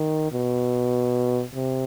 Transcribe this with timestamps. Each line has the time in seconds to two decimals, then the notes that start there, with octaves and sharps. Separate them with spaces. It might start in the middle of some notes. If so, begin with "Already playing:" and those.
Already playing: D#3
0.32 B2
1.54 C3